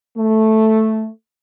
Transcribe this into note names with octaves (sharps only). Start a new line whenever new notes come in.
A3